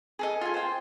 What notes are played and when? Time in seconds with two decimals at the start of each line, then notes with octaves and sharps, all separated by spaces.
0.19 G#4 A4 D#5
0.41 F4 F5 G#5
0.54 C5 G5